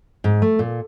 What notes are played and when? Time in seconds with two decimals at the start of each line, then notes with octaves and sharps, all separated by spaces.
0.24 G#2
0.42 A3
0.59 A#2